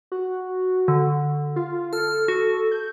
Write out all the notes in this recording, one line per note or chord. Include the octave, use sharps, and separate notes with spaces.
F#4
D3
F4
A4 F6
F#4
G6